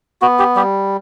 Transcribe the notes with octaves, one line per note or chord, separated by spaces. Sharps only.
B3 F#4
G4
G3 G4